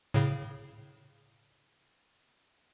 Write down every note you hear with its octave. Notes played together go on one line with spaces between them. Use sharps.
A2 C#3